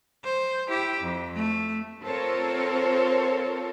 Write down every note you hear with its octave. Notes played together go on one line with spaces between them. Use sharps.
C5
E4 G4
F2
A3
C4 F4 A4 A#4 C5 C#5